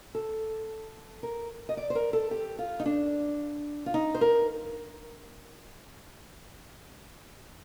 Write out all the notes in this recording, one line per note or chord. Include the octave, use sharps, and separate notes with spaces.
A4
A#4
D#5
D5
C5
A#4
A4
G4
F4
D#4
D4
F4
D#4
C5
A#4